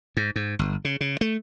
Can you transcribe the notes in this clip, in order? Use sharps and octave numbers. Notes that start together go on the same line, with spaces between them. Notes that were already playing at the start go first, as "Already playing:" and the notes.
G#2
G#2
G1
C#3
C#3
A3